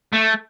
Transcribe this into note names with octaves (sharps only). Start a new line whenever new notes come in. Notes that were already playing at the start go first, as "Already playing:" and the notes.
A3